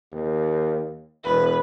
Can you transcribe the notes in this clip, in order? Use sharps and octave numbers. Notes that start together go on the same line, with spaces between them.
D#2
E1 B4